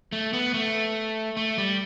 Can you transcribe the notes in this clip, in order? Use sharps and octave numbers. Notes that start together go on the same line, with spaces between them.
A3
B3
A3
A3
G3